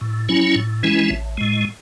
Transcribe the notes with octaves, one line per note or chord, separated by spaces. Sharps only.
A2
F#3 C#4 E4
A2
E3 G#3 C#4 E4
A1
A2 G#3